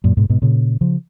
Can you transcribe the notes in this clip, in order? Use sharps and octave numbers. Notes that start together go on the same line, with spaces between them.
F#2 A#2
G#2 B2
G#2 B2
A#2 C#3
C#3 F3